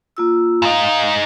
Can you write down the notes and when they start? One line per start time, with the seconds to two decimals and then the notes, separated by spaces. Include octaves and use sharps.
0.17 A#3 F4 E6
0.62 G#2 D#4 F5